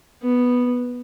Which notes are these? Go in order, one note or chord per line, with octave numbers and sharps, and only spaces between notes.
B3